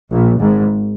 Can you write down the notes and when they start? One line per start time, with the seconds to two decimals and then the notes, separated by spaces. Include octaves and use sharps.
0.11 A#1 A#2
0.40 G#1 G#2